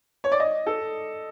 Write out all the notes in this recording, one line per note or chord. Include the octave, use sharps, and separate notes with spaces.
C#5
D5
D#5
A4